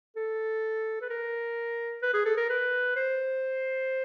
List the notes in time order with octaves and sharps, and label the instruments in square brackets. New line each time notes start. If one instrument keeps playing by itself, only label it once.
[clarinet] A4
B4
A#4
B4
G#4
A4
A#4
B4
C5